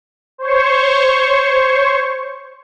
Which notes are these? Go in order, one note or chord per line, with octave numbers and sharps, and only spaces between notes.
C5 C#5 C#6